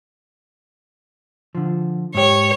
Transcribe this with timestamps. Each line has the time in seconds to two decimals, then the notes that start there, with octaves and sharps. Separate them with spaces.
1.55 D3 F3
2.15 G#2 G4 C#5